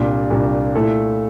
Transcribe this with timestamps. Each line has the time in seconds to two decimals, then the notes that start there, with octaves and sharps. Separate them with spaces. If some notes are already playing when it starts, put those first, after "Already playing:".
Already playing: C2 A#2 G3 D4
0.30 C2 A#2 G3 D4
0.75 A#2 A3 E4 A4